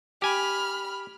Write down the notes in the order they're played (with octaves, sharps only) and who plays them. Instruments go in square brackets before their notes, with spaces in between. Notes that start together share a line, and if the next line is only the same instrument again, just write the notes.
[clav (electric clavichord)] G4 G#5 [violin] B5 F6